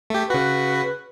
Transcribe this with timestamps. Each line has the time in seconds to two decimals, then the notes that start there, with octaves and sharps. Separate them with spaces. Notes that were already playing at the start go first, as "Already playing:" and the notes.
0.10 A3 G4
0.30 C#3 F#4 B4